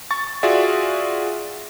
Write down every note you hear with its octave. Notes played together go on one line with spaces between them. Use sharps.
C#6 A6
F4 F#4 G#4 D5 E5